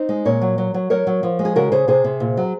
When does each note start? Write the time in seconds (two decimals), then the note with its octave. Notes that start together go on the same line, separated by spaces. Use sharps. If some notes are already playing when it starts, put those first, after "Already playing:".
Already playing: C4 D#4
0.09 G#3
0.25 A#2 A#4 C#5
0.42 F#3
0.58 F#3
0.74 F#3
0.90 F#3 A#4 C#5
1.07 F#3
1.23 F3
1.39 G#3
1.45 G#4
1.56 C#3 F#4 A#4
1.72 C#3 G#4 C5
1.88 C3 G#4 C5
2.04 C3
2.20 A#2
2.37 F#3